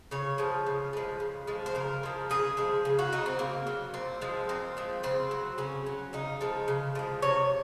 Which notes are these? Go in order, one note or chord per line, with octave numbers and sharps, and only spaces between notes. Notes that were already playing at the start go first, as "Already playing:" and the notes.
C#3 C#5
F3 G#3
C#3
F3 G#3
C#3
F3 G#3
C5
C#3 A#4
F3 G#3
C#3 G#4
F3 G#3
C#3
F#4
F#3 D#4
C4
C#3 A#3
F#3
A#2 C4
F3 G#3
A#2 C4
F3 G#3
C#3 C4
F#3
C#3 C#4
F#3
C#3 D#4
F3 G#3
C#3
F3 G#3
C3 C#5